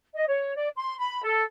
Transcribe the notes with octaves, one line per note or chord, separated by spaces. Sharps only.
D#5
C#5
D5
C6
B5
A4